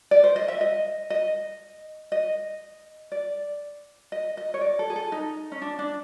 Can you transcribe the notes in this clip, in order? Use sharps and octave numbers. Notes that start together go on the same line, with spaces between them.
D5
C5
D#5
E5
D#5
D#5
D#5
D5
D#5
D#5
C#5
D5
A4
G#4
A4
D#4
C#4
D4
D4